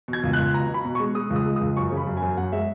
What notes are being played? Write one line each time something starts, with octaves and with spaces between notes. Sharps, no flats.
B2
G#6
C#2
F#6
C#2
B2 A#5
B2
B5
B2
G#3 C#6
G#3 D#6
C#2
D#6
G#3
D#6
C#2
F#2 C#6
C#3
B5
F#2
G#5
F#2
F#2 F#5
G#3 E5